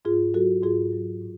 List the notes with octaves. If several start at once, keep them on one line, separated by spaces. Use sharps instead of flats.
G#2 F4 G#4
F#3 F#4 A4
G#2 F4 G#4
F#3
A2